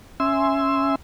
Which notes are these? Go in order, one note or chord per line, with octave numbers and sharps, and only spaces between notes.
C#4 E5 G#5 C6 E6